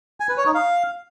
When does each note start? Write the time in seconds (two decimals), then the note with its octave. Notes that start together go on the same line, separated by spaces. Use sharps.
0.20 G#5
0.29 B4
0.37 C#5
0.46 D#4
0.55 F5